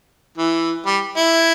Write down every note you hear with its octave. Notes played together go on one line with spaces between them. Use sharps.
E3
G3
E4